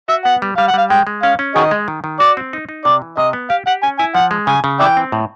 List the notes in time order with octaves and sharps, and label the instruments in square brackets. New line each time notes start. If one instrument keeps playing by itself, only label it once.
[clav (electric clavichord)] F#4 [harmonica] E5
[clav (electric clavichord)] B3 [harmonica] F#5
[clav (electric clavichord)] G3
[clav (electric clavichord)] G3 [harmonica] F5
[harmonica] F#5
[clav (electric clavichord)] G3 [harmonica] F5
[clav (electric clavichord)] G#3 [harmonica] G5
[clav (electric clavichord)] G#3
[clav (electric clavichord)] C#4 [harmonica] F5
[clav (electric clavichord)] C#4
[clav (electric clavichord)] D#3 [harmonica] F#4 G#4 D#5
[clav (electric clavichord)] G#3
D#3
D#3
[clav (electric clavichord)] F#4 [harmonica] D5
[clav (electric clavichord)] C4
D#4
D#4
[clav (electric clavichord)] C3 [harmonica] D5
[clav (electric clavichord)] E3
[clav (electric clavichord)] C3 [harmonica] D#5
[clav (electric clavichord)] B3
[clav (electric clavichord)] G4 [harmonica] F5
[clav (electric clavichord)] G4 [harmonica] F#5
[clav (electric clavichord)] C#4 [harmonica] G#5
[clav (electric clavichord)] E4 [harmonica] G#5
[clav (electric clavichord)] F3 [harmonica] F#5
[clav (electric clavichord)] G#3
[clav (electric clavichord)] C#3 [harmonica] G#5
[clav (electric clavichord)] C#3
[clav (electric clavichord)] E3 [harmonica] D5 E5 G5
[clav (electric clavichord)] C4
A2